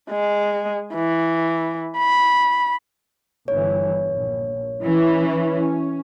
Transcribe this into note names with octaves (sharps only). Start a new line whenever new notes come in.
G#3
E3
B5
G1 G2 E3 C#5
A#1
E3 C#4